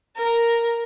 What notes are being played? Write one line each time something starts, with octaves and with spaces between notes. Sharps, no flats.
A#4